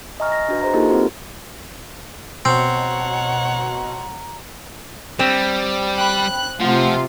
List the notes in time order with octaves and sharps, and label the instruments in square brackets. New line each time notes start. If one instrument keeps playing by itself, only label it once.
[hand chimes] D#5 E5 G#5 A#5 C#6 F6
A#6
D4 F#4 B4
G#4 B4 C5 D#5 E5 A#5
A#3 D#4 F4 G4 A4 A#4
C4 D#4 F#4
[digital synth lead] B2 [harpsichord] C4 [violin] C#5 F#5 [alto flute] A#5
[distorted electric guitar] G3 [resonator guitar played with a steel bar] C4
[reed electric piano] G5 B5 [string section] F#6
[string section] C3 F4 [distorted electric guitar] F3 [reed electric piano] A3 F#5